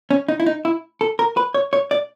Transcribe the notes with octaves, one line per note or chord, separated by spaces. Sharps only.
C#4
D#4
E4
D#4
E4
A4
A#4
B4
C#5
C#5
D5